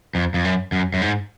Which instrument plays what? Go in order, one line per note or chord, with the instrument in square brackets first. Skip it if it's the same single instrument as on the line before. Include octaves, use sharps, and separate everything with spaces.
[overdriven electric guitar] F2
F2
F#2
F#2
F#2
G#2